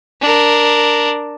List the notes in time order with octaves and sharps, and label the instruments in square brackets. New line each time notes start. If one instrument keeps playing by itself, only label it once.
[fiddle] D4 A#4